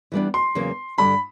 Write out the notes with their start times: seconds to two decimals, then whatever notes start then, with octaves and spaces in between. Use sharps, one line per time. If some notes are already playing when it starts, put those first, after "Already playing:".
0.12 E3 G3 B3 D4
0.34 C6
0.55 E2 C#3 F#3 A#3
0.98 G2 D3 G3 B5